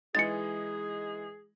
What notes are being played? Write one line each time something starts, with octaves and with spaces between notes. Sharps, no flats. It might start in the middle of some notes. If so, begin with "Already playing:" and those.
E3 G#3 D#4 G#4 A6 C#7